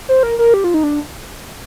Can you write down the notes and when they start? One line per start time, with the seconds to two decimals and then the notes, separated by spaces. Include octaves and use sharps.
0.09 C5
0.23 A#4
0.39 A#4
0.54 G4
0.64 F4
0.74 D#4
0.83 D4